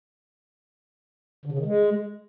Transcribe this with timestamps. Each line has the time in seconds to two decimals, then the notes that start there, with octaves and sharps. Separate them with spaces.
1.46 D3
1.52 C#3
1.59 D#3
1.65 G#3